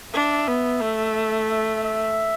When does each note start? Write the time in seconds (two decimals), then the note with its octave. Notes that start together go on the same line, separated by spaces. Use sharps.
0.14 D4 E5
0.47 B3
0.82 A3
1.51 E5
1.84 E5